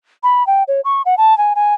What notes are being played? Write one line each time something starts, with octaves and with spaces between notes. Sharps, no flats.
B5
G5
C#5
C#6
F#5
A5
G#5
G#5